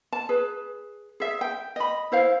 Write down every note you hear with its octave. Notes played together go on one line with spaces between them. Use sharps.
A5
G#4 B4
G#4 E5
G5
D#5 B5
E4 C5 F5